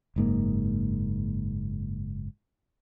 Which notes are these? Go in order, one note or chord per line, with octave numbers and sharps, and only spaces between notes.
F#1 G#2 A#3